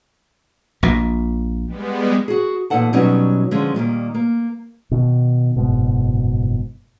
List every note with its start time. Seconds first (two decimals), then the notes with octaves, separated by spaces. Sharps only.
0.83 A#1 A#2
1.67 G3 G#3 B3
2.28 F#4 G#4
2.70 E2 A#2 D#4 A4 F#5 A5
2.93 B2 F#3 G3 C#4 D#4
3.51 D3 F3 G#3 C#4
3.75 A#2 D#3 G3 A#3
4.14 A#3
4.91 B2 D#3
5.56 F#1 G#2 B2